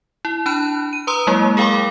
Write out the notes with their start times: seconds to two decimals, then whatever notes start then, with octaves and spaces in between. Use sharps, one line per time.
0.25 E4
0.46 D4 A5 B5 F#6
0.93 D#7
1.07 B4 A#5 C6 D#6 E6
1.27 F#3 G#3 A#3 E4
1.57 G#4 A#4 F5 G5 B5 D6